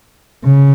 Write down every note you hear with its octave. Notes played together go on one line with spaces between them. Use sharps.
C#3